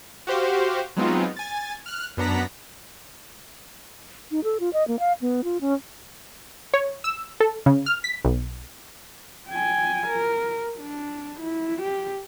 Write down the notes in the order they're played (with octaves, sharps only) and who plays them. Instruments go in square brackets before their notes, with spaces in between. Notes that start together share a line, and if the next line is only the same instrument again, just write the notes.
[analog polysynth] F#4 G4 C5 F5
F#3 G#3 B3 C4 D#4 F4
G#5 A6
F6 F#6
F#2 B3 D4 F#5 A#5 B6
[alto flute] D#4
A4
F4
D#5
A#3
F5
B3
F4
C#4
[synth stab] C#5
E6
A4
C#3
F6
B6
B1
[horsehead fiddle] G5 G#5
A#4
D4
E4
G4